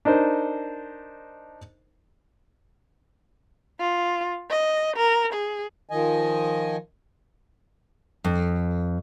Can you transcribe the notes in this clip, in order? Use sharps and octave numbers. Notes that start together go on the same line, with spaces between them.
D4 D#4 A#4 C5
F4
D#5
A#4
G#4
D#3 F3 D#5 G#5
F2